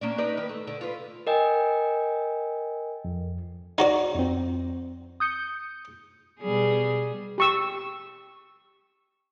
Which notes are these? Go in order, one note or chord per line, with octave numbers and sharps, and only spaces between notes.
A#3 C#4 D4
D#4 B4 D5
D#3 B4
A3
D3
F4 B4
A#4 D#5 G5 G#5
F2
D#4 F#4 D5
F2 C4
D#6 G6 C#7
B2 G3 G#4
G4 C#6 E6